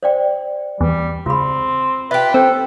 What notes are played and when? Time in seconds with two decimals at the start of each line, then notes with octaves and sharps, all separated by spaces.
0.03 C5 D5 G5
0.81 E2 G3
1.26 C#2 C4 F4 B5
2.11 F4 G4 B4 E5
2.34 C4 A4